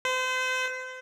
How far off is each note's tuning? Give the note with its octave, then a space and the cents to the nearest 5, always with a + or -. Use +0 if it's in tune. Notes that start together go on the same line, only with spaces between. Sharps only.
C5 -35